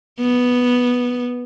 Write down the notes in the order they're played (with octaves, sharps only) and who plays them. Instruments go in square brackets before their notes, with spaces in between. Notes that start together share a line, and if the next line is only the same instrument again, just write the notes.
[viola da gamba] B3